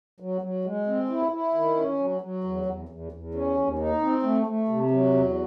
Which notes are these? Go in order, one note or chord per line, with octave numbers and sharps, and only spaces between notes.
F#3
F#3
G#3
C4
E4
E4
D#3
C#4
F#3
F#3
E2
E2
E2
E2
C#4
D#2
D#4
C4
A3
A3
C3
F#3
E2